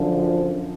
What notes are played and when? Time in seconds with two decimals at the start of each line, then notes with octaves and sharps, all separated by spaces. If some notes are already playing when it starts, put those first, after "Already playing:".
Already playing: F#2 D3 F3